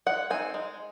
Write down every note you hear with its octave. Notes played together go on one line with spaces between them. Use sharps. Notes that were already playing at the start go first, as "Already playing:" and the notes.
G#3 F#5
C4 D#4 G#5
G#3